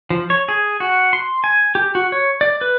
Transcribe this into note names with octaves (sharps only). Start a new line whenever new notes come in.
F3
C#5
G#4
F#4
C6
G#5
G4
F#4
C#5
D5
B4